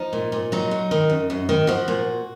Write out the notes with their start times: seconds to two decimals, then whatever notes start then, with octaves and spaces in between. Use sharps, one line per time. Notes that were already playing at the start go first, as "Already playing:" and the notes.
Already playing: F3 D#4
0.13 A#2
0.32 A#2
0.52 F#3 D#4
0.71 F#3
0.91 D#3
1.09 F#2
1.30 F#2
1.49 D#3
1.67 F3 F#4
1.88 A#2